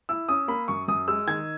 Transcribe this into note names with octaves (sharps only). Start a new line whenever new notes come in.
E4 E6
C#4 D#6
A#3 B5
F#2 C#6
F#2 D#6
G#3 E6
D#3 G#6